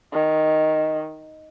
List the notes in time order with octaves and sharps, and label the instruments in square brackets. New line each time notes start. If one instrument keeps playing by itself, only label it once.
[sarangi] D#3